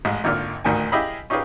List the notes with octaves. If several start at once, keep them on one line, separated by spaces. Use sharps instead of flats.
A1 G#3
G#1 A#2 D3 F6
A1 D2 D#3 G#5
E4 G4 G#4 D#5 F5 B5
C#4 D#4 F4 G4 G#4 B4